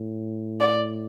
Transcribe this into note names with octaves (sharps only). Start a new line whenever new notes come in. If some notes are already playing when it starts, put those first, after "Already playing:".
Already playing: A2
D5